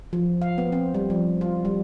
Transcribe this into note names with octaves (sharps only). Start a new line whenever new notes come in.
F3
F5
B3
C4
G3
F3
F4
G3